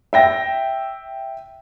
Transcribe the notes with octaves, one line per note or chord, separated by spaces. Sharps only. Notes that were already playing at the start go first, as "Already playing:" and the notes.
E5 G5 A#6